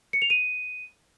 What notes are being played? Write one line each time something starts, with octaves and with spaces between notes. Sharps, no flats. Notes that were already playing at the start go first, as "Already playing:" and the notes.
C#7
F7
D#7